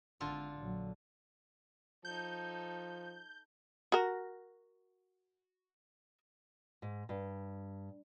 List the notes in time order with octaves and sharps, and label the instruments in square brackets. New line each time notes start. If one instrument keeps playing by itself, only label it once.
[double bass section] G#1 [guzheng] D3 F4 A4
[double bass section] A#1 F#3
[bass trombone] F3 [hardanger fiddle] D#4 A4 [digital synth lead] G6
[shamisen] F#4 A#4
[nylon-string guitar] G#2
G2